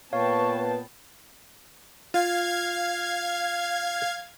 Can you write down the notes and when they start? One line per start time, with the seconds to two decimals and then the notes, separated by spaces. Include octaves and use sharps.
0.13 A#2 B3 B4 C#5 F5 G5 A5 C#6
2.14 F4 F5 G#6